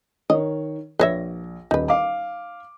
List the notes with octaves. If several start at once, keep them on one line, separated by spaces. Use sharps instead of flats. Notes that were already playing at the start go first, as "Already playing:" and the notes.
D#3 A#4 C#5 D#5
A#1 B4 C#5 E5 A#6
D#1 D#4 B4
F5 D6